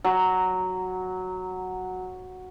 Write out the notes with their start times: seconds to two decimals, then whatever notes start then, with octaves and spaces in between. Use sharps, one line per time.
0.04 F#3